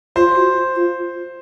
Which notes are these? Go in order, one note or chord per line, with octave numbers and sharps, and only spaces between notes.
F4 C5
F#4
F4